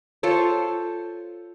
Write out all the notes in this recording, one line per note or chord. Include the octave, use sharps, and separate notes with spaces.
F4 A4 C5 C#5